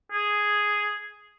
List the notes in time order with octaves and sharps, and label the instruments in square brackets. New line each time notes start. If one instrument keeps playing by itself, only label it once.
[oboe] G#4